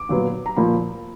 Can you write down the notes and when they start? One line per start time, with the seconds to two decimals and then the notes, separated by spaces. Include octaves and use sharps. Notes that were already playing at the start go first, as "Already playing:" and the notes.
Already playing: D6
0.09 A#2 F#3 B3
0.46 A#5
0.57 A#2 F3 A#3 B5